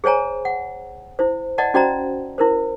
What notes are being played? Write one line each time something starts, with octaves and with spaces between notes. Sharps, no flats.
G#4 C5 C#5 G#5 A#5
F#5
E4 C5
D5 D#5 F#5 A5
C#4 F#4 C5 D5 D#5 A#5
E4 A#4 C5